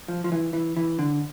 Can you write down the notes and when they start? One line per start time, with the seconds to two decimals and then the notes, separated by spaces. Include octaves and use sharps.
0.08 F3
0.24 F3
0.32 E3
0.53 E3
0.77 E3
0.99 D3